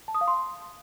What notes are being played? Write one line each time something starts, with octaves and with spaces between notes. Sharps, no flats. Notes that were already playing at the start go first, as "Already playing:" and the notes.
A5
D#6
F5
C6